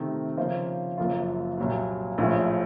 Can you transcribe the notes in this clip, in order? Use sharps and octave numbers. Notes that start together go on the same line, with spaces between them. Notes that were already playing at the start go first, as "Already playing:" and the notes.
Already playing: C3 D#3 A3 C4
C#3 F3 A#3 F4 C5
F#1 F#2 F3 A#3 F4
C2 A#2 F#3
A#1 A2 F3 A3